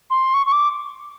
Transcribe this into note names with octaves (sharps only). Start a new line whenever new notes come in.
C6
C#6
C#6
D6